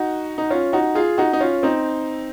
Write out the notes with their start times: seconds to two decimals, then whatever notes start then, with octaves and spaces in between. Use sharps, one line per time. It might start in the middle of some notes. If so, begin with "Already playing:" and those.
Already playing: D#4 F#4
0.38 D#4
0.50 C#4 F4
0.73 D#4 F#4
0.95 F4 G#4
1.18 D#4 F#4
1.33 D#4
1.41 C#4 F4
1.63 C4 D#4